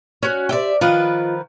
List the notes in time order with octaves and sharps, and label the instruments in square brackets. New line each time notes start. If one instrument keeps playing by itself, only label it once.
[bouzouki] C#4 F#4 [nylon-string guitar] C#5
[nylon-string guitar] G4 C5 [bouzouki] D5 E5 G5
[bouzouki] D#3 F3 B4 [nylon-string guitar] F4 D#5